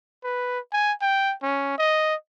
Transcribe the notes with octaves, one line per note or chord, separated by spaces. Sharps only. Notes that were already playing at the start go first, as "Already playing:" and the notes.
B4
G#5
G5
C#4
D#5